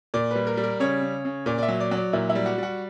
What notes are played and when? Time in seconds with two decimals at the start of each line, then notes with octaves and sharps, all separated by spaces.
0.14 A#2 D5
0.31 G3 B4
0.47 A#4
0.57 G3
0.63 A#4
0.80 C#3 C#5
1.02 C#3
1.25 C#3
1.46 A#2 D5
1.58 D5
1.63 E5
1.68 F#3
1.80 D5
1.91 F#3
1.97 D5
2.13 A#2 E4
2.30 E4
2.35 G3
2.46 F#4
2.58 G3 F#4